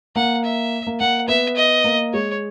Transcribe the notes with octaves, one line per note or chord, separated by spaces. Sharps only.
A#3 F#5
E5
A#3
A#3 F#5
B3 E5
D#5
A#3
G#3 C#5